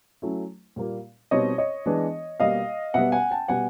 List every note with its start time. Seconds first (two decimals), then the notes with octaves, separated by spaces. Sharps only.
0.22 F#3 A3 C#4 E4
0.76 A#2 G3 A#3
1.31 B2 G3 C4 D#4 C#5 D#5
1.58 C#5 D#5
1.86 E3 G#3 B3 D4
2.40 B2 G3 A#3 D#5 F5
2.94 B2 G3 B3 E5 F#5
3.12 F#5 G#5
3.31 G5 A5
3.48 B2 G3 B3 F#5 G#5